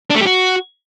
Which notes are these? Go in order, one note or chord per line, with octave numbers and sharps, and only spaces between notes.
D4
A3
G4
F#4